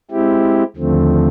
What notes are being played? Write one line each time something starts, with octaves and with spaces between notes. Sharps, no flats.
G#3 C4 E4 G4
D#2 D3 F3 A3 C4